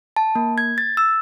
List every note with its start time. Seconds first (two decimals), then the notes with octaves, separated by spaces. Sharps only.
0.17 A5
0.35 A#3
0.58 G#6
0.78 A6
0.97 E6